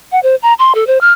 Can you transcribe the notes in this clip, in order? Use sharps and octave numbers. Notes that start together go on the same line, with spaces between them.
F#5
C5
A#5
C6
A4
C5
F6